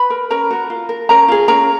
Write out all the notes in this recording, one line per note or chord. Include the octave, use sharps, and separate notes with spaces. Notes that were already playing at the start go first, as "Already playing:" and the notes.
Already playing: B4 B5
A#4
C#4 A#4 A#5
F#4 A#4
F4
A#4
C#4 A#4 A#5
F4 G#4
C#4 A#4 A#5